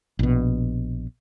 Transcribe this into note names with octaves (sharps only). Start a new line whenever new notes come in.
A#1 B2